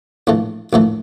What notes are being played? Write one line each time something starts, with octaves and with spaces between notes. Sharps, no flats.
A#1 A2 E3 A3
A#1 A2 E3 A3